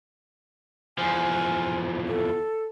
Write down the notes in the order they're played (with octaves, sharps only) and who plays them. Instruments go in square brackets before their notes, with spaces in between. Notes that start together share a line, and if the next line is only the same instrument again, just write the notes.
[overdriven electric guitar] E2 F3 [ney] G#5
[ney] A4